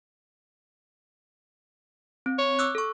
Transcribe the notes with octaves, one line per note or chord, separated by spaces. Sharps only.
C4
C#5
D6 E6 F#6
A4 C#6